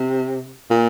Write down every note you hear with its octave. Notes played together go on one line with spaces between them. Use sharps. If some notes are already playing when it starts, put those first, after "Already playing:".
Already playing: C3
A#2